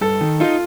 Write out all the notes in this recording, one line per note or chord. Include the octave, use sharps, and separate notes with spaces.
G2 A4
D#3
D#4 F4